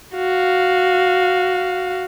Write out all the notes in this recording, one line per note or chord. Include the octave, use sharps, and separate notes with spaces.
F#4 F5